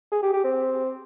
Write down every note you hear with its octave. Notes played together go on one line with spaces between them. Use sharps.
G#4
G4
G4
C4